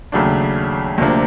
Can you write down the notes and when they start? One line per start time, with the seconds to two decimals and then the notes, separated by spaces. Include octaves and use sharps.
0.12 D#2 C#3 F#3 A3 D4
0.98 D2 C3 F3 A#3 D4